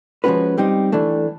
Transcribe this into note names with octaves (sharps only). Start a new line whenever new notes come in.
F3 G#3 C#4 F#4 B4
G3 C4 D#4 G4
E3 A3 D4